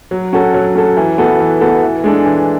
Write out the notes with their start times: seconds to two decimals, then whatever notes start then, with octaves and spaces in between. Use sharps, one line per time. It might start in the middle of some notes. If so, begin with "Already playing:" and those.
0.11 F#3
0.33 C#4 F#4 A4
0.54 F#3
0.75 C#4 F#4 A4
0.97 E3
1.18 B3 F#4 A4
1.40 E3
1.61 B3 F#4 A4
1.83 E3
2.04 G#3 D4 A4
2.25 E3